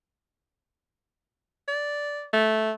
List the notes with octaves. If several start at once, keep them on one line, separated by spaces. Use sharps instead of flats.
D5
A3